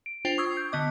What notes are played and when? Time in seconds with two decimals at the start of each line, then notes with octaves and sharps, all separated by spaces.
0.06 D7
0.25 D4 F4 C5 G5
0.38 C#6 D#6 E6 G#6 C7
0.57 G6
0.72 D3 B3 D#5 D6